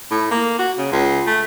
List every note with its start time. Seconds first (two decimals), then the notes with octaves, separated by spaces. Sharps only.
0.11 A2
0.31 A#3
0.59 F#4
0.78 C#3
0.92 C#2
1.27 A3